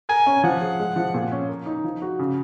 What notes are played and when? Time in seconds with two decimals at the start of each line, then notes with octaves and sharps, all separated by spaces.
0.09 A#4 G#5
0.26 C#4
0.44 F3 F#5
0.61 G#4
0.80 G#3
0.96 F3
1.14 A#2
1.32 C#4
1.49 A#4
1.66 D#4
1.84 F3
2.02 F#4
2.19 C#3